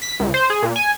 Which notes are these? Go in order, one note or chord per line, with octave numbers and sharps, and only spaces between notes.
B6
C#2
C5
G#4
A#2
G#5